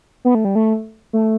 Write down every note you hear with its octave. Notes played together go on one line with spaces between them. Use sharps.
B3
A3
G3
A3
A3